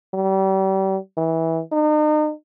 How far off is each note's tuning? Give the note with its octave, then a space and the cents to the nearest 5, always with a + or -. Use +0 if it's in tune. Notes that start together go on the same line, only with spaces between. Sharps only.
G3 -35
E3 -20
D#4 -40